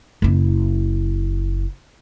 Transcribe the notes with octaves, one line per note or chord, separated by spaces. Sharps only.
F#1 E4